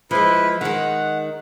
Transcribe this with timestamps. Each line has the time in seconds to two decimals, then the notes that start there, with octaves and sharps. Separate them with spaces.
0.11 F3 G#3 E4 B4
0.61 D#3 G#3 F#5